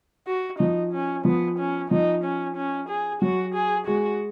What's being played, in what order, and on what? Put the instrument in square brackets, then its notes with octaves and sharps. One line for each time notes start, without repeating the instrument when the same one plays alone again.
[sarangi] F#4
[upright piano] F3 [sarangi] D#4
[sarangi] C#4
[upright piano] F3 [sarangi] B3
[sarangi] C#4
[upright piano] F3 [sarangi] D#4
[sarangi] C#4
C#4
G#4
[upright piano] F#3 [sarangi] F#4
[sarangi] G#4
[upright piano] G#3 [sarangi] F#4